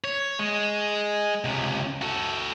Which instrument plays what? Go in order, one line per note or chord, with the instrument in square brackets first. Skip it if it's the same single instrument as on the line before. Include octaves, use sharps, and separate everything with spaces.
[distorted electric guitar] C#5
G#3
C#2 C3
F#4 A4